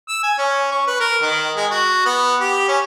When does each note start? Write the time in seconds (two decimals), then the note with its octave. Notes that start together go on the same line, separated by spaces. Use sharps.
0.08 E6
0.23 G#5
0.38 C#4
0.72 C#6
0.87 B4
1.00 A#4
1.22 D#3
1.56 G#3
1.71 F#4
2.05 B3
2.40 G4
2.68 C#4